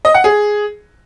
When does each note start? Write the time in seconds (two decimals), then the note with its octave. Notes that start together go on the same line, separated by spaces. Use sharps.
0.05 D#5
0.14 F#5
0.24 G#4